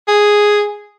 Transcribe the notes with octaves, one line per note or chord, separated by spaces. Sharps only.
G#4